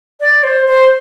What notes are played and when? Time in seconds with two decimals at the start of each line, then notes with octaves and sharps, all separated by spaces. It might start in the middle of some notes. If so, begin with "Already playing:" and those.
0.20 D5
0.43 C5
0.66 C5